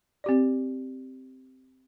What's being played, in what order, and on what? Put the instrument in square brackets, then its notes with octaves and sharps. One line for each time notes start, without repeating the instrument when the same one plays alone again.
[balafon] C4 G4 D5